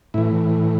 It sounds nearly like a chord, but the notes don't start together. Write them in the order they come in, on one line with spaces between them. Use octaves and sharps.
A2 E4 E3